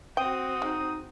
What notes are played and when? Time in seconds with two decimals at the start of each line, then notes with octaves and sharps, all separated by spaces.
0.17 C4 F#4 G5 D#6
0.62 G#3 D#4